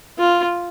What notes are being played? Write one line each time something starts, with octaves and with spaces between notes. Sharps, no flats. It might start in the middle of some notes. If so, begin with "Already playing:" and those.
F4